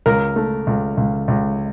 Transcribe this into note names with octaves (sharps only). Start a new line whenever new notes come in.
C#2 A#4
A3
C#2
C#2
C#2